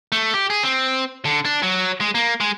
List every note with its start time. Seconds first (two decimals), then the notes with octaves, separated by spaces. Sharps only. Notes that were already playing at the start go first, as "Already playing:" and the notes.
0.12 A3
0.34 G4
0.50 G#4
0.63 C4
1.25 D3
1.45 D4
1.63 F#3
2.01 G#3
2.15 A#3
2.40 G#3